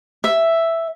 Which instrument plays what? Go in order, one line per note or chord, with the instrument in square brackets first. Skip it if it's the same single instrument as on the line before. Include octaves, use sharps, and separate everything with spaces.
[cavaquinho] E5